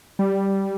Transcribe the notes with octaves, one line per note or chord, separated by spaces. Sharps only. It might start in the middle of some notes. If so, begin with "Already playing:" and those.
G3